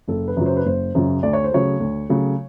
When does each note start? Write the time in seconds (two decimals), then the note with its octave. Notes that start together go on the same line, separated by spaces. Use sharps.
0.08 F#1 A4
0.28 B4
0.37 F#2 C#3 F#3
0.46 C5
0.57 B4
0.65 F#1 C5
0.95 F#2 C#3 F#3
1.23 D2 D5
1.33 C#5
1.44 C5
1.52 C#3 F#3 A3 C#5
1.80 D2
2.09 C#3 F#3 A3